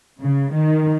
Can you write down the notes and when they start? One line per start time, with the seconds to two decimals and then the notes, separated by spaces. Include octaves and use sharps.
0.21 C#3
0.55 D#3